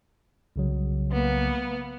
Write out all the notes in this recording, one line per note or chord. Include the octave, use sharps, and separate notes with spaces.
C2 C#3 F#3
A#3 B3